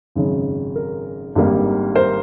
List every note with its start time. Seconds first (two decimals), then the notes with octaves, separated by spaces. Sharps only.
0.15 G#1 F#2 C#3
0.76 A#4
1.35 G#1 G2 D#3 G3 A#3
1.95 A#4 C5